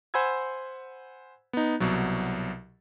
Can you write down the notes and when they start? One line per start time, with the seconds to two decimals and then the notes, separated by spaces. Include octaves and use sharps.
0.14 C5 F#5 G#5 B5 E6 G#6
1.53 B3 D#4
1.80 C2 B2 F#3